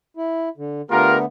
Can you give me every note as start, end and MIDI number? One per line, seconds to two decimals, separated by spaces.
0.17 0.49 64
0.58 0.82 50
0.90 1.25 50
0.90 1.25 57
0.90 1.25 59
0.90 1.17 65
0.90 1.17 67
0.90 1.17 70